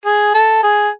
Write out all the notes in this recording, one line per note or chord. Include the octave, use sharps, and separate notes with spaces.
G#4
A4
G#4